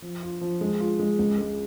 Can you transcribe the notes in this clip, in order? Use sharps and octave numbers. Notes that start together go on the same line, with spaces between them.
F3
F4
F3
G#3
F4
G#3
C#2
G#3